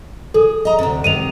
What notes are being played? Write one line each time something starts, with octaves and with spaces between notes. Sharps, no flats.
G#4 A4
D#5 A#5
D2 C3
C3 D#3 G#3 D#7 F7